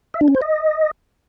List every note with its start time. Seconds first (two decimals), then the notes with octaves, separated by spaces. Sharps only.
0.14 E5
0.21 D4
0.28 C#4
0.35 C5
0.42 D#5